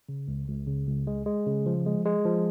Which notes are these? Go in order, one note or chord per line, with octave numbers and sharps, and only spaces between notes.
C#3
C#2
C#2
C#3
C#2
G#3
G#3
C#3
F3
G#3
G#3
F3